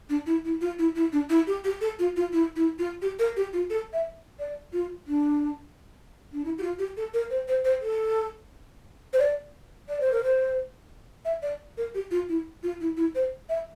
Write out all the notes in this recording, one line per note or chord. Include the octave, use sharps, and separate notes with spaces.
D4
E4
E4
F4
E4
E4
D4
E4
G4
G4
A4
F4
F4
E4
E4
F4
G4
A#4
G4
F4
A4
E5
D5
F4
D4
D4
E4
G4
F4
G4
A4
A#4
C5
C5
C5
A4
C5
D5
D5
C5
A#4
C5
E5
D5
A#4
G4
F4
E4
F4
E4
E4
C5
E5